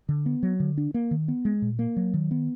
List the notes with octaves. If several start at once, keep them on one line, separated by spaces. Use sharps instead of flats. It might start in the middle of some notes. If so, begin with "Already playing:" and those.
D3
B3
F#3
D3
D4
A#3
D#3
B3
G#3
A#2
A#3
F#3
D#3
B3